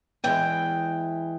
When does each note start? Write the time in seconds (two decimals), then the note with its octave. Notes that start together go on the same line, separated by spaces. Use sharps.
0.24 E2 E3 G#3 G5